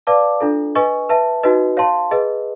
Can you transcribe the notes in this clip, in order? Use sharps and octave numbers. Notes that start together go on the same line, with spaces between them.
B4 D5 F5 A5 D6
D4 F4 A4
B4 D#5 G#5 C#6
B4 E5 A5
D#4 F#4 B4 D#5
C#5 F5 A5 C6
G#4 B4 D#5